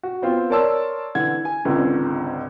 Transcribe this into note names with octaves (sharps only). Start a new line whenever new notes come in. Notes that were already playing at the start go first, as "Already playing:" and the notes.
F#4
B3 C4 F4
A#4 C#5 D5 A5 C6 E6
D3 E3 F#5 G#6
G#5
G#1 C#2 G#2 D3